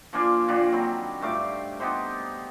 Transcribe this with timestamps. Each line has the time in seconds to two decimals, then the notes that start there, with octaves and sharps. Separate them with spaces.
0.13 F3 A#3 D4 G#5
0.48 A#2 D#3 D4
0.72 F#3 C4 B5
1.21 G2 A3 F5 D6
1.80 B3 D#4 G4 C5